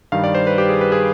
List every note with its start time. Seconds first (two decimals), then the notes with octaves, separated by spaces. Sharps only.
0.12 G2 D#3 G3 F5
0.24 D5
0.35 C5
0.47 B4
0.58 G4
0.69 G#4
0.81 B4
0.92 G#4